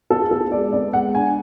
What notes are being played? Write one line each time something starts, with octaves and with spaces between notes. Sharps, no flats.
B3 A4
G#4
B3 A4
G#3 D5
B3 D5
G#3 F#5
D4 G#5